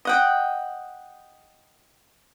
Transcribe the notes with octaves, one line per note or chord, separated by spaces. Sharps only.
D#5 F#5 G5